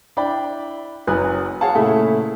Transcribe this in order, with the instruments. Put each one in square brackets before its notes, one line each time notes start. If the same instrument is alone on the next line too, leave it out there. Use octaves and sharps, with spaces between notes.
[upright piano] D4 E4 D5 G5 B5
F#1 F#3 B4 G#5 D#6 F#6
G#4 C#5 F5 F#5 A5
A#2 C#3 A3 E4 G#4